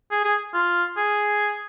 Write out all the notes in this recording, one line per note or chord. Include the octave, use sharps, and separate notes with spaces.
G#4
G#4
F4
G#4